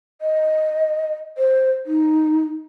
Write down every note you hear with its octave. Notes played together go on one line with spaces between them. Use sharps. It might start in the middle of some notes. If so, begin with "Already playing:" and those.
D#5
C5
D#4